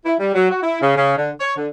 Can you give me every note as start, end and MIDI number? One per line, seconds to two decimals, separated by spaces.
0.06 0.15 64
0.20 0.33 55
0.34 0.50 54
0.51 0.62 66
0.63 0.79 64
0.82 0.95 49
0.97 1.14 49
1.18 1.32 50
1.40 1.55 73
1.57 1.69 50